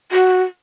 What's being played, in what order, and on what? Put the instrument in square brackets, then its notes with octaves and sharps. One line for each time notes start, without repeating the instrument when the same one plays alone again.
[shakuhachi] F#4